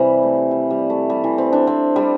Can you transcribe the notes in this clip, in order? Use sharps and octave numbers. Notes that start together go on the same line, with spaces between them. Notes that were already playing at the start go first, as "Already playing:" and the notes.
Already playing: C3 E3 G3
A3
G3
G3
A3
G3
E3
C4
D4
C4
G3